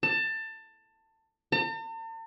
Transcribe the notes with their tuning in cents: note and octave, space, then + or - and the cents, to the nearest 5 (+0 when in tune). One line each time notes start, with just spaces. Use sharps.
A5 +20
A5 +45